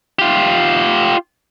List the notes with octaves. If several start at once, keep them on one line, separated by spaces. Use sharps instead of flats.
F4 G4